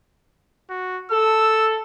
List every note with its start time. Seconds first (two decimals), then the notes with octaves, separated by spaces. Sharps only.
0.70 F#4
1.11 A4 E6